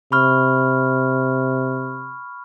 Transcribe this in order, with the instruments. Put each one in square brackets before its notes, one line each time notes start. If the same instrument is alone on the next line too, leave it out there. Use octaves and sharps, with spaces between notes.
[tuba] C3 [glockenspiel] B5 C#6 F6